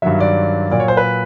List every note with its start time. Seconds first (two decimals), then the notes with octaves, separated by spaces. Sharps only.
0.02 G2 D#3 F#3 E5
0.20 D5
0.71 A#2 F#3 D5
0.80 C#5
0.88 C5
0.97 B4